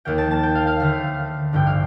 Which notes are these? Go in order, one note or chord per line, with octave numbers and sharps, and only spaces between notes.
D#2 D#3 A#3 G5
A5
A5
G5
F5
F5
D2 D3 A3 F5
A1 G2 D3 G5
F5